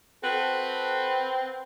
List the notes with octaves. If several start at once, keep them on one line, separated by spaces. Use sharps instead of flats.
C4 F#4 A4 B4